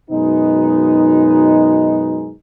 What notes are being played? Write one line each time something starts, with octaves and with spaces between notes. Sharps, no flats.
F#2 B2 G#3 B3 D#4